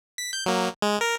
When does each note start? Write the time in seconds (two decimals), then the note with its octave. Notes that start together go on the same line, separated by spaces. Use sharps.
0.18 B6
0.33 G6
0.46 F#3 A#3
0.82 G#3
1.01 A#4